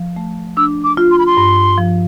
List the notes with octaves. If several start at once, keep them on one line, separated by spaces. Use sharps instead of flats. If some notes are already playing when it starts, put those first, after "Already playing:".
Already playing: F3
A3
D4 E6
D6
F4
C6
B5
C6
G2
F3